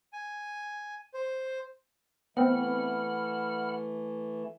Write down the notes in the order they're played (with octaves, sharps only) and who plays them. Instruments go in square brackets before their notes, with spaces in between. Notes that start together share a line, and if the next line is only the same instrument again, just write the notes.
[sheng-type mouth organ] G#5
C5
[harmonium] E3 A3 [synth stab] B3 C4 [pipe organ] F#5 B5 F6